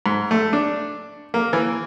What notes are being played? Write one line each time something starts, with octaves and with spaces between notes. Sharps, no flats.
G#2
A3
D4
A#3
E3